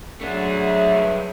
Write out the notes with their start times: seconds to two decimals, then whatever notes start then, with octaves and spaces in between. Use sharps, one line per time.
0.21 F#3 A3 D4 G#4
0.60 E5
0.93 G2